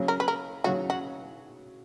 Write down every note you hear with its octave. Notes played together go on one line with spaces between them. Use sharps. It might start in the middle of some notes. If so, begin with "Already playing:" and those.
Already playing: C#3 F#3 C#4
A#4
B4
A#4
C#3 F#3 C#4 F#4
F#4